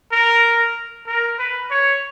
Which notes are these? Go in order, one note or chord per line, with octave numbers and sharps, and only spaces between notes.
A#4
A#4
B4
C#5